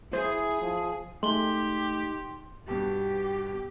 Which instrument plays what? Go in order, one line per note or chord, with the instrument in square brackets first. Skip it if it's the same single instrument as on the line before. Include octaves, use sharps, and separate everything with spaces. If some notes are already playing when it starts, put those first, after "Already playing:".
[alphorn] E4 [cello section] G#4 [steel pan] C5
[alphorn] F3
[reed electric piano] G#3 A3 [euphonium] D#4 [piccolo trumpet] G4 [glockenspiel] C6 G7
[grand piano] G2 B2 [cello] G4